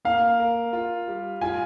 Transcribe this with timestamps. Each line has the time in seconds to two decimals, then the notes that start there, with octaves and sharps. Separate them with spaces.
0.05 A#3 F5
0.40 A#4
0.73 F4
1.08 G3
1.41 F4 G#5